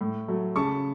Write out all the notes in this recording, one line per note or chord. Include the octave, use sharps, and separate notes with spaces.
A2
F#3 A3
C#3 A5 C#6